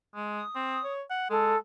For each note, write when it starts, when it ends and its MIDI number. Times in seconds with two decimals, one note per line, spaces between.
0.15 0.42 56
0.36 0.93 87
0.55 0.79 60
0.84 1.02 73
1.10 1.27 78
1.30 1.55 56
1.30 1.57 69